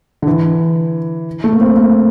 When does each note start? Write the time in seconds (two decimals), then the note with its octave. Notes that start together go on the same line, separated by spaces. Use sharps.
0.22 D3
0.27 E3
1.44 A3
1.53 A#3
1.61 C4
1.77 A#3